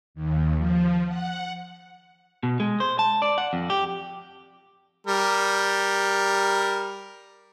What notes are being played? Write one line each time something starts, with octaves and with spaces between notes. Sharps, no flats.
D#2
F3
F#5
B2
G#3
C5
A5
D5
F#5
F2
G4
G3 A#4